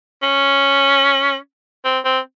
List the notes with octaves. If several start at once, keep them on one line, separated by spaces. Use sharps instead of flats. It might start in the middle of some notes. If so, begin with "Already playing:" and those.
C#4
C4
C4